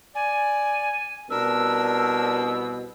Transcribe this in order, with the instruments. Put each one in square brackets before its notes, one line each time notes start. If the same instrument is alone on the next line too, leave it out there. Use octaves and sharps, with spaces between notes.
[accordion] D5 [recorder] G#5
[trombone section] C2 B2 [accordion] D4 A#4 [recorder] E6